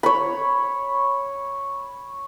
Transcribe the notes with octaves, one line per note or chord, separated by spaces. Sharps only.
C#5 B5